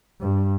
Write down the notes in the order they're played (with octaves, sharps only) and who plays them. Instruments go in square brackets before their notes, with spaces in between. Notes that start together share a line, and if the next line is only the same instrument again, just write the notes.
[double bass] G2